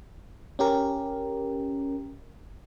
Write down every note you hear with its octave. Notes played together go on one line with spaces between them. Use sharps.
C#4 G4 A#4